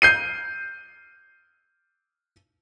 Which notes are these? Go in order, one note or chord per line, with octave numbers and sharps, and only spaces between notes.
G6 C7 D#7